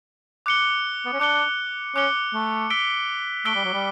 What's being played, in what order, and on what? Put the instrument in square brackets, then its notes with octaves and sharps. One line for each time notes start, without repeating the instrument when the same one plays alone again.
[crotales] D6 F#6 C#7 G7
[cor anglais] B3
C#4
[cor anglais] D4 [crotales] D6 F#6 C#7 G7
[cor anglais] C#4 [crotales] D6 F#6 C#7 G7
[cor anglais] A3
[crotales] E6 B6 D7 G7
[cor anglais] A3 [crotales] E6 B6 D7 G7
[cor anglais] G3
F#3
G3